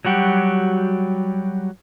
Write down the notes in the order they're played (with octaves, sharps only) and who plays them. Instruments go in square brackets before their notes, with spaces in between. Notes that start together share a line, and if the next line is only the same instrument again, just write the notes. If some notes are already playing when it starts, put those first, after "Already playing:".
[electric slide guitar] F#3 G3 F#4 G4